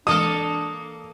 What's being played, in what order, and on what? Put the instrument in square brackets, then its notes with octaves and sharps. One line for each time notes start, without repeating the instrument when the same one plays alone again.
[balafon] E3 G#3 [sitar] A#3 A4 [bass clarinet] D4 [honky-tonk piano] D#6